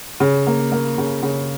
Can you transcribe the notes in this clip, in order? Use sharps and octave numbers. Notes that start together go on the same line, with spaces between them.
C#3
A#3
A#3
C#3
C#3